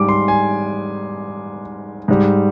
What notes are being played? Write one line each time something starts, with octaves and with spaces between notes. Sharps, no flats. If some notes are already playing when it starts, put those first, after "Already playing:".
Already playing: G#2 G3 D6
C6
G#5
G#2 G3